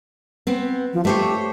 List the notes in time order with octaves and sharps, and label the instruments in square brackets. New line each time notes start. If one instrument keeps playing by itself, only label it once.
[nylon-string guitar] B3 C4
[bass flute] F3
[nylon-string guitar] A3 C5 C#5 [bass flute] G4